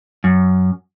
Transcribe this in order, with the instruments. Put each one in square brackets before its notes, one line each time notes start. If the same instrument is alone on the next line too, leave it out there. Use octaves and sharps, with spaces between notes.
[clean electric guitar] F#2